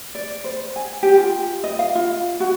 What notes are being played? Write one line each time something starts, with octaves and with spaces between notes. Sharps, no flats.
D5
C5
G#5
G4
F4
D#5
F5
F4
F#4